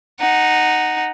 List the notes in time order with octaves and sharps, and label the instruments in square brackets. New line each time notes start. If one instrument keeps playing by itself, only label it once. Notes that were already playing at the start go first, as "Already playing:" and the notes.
[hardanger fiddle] D#4 F#5